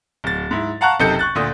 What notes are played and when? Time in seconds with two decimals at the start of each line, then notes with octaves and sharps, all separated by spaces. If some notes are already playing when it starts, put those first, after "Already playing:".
0.24 D1 A6
0.51 G#2 E4
0.81 F5 F#5 A5 A#5 C#6 F#6
1.00 F#1 C3 D#4 A4 G6 C#7
1.19 C#6 F#6 A6
1.35 D2 A#2 D#6